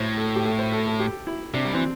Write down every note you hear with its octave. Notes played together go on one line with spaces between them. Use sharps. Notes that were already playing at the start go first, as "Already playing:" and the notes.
Already playing: A2 C5
A4
G4
A4
C5
A4
A4
G4
E4
C3 D4
G3
E3 C4